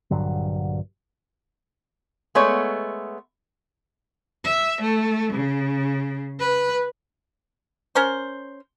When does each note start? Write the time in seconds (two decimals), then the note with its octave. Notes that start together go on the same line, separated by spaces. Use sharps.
0.11 A#1 G2 D3 F#3
2.35 G#3 A3 B3 C#5
4.45 E5
4.81 A3
5.33 C#3
6.40 B4
7.95 C#4 A#4 C5